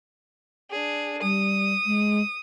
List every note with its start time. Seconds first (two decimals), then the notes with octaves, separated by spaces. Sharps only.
0.71 D4 G#4
1.22 G3 D#6
1.86 G#3